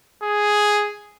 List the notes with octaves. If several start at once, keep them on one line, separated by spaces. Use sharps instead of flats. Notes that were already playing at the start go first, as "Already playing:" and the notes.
G#4